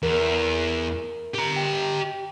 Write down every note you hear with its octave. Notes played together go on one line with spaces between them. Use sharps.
E2 A#4
G4 A#5
G5